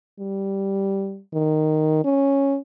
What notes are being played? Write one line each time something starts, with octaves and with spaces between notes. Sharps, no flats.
G3
D#3
C#4